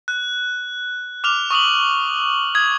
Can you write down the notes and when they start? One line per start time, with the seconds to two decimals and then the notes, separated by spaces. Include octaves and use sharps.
0.08 F#6
1.24 D6 F6 F7
1.51 C#6 D#6 F7 F#7
2.55 D#6 G#6